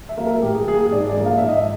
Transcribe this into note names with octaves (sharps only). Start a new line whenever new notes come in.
E5
F#3 A#3
A#4
A2 G4
G#4
F#3 A#3 G#4
G#4
G#2 D5
D5
F3 A#3 D4
F5
G#2 E5
D#5
E5